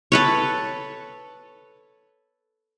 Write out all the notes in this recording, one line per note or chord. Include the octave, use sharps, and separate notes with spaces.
A4 B4 C#5